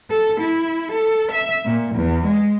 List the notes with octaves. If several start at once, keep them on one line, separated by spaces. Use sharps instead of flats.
A4
E4
A4
E5
A#2
E2
G#3